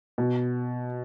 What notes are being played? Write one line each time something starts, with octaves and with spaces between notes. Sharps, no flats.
B2